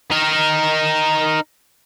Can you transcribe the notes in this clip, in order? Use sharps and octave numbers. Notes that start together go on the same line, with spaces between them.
D#4 A#4